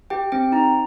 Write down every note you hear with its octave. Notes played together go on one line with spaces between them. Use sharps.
G4 G5
C4 G5
D#4 A#5